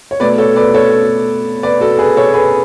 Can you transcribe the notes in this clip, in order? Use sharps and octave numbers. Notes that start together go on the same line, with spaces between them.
C#5
B2 A3 B4 D5
A4 C#5
B4 D5
A4 C#5
B4 D5
F#4 A4
G#4 B4
A4 C#5
G#4 B4